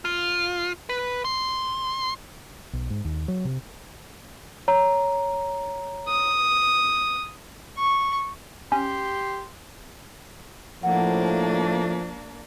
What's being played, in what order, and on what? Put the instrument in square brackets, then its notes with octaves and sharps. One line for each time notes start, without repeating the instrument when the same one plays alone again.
[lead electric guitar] F4
B4
C6
[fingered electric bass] B1
G#2
D#2
F#3
C3
[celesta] C#5 A#5
[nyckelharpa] D#6
[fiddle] C#6
[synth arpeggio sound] C#4 [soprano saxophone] G4 [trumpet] C6
[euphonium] A2 [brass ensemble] F3 [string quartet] A#3 D4 [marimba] F#5